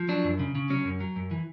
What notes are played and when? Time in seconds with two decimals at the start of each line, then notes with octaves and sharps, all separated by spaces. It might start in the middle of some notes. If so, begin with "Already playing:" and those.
Already playing: F3
0.09 F#3 D4
0.24 F#2
0.39 C#3
0.55 C#3
0.70 F#3 C#4
0.85 F#2
1.00 F#3
1.16 F#2
1.31 E3